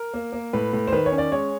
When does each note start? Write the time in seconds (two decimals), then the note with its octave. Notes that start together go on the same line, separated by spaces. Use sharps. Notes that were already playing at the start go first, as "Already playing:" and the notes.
Already playing: A#4
0.14 A#3
0.33 A#3
0.53 A2 B4
0.73 A2
0.88 C5
0.92 D#3 B4
1.06 C#5
1.12 C#4
1.18 D5
1.32 G#3 C#5